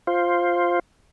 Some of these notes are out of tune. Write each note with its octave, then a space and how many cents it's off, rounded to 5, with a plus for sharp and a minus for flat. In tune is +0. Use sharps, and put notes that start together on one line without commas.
F4 +0 C5 +5